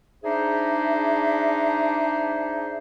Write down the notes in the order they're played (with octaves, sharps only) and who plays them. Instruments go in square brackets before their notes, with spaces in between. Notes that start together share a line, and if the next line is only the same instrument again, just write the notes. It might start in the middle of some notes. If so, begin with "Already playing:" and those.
[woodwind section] D4 D#4 G#4 C5 E5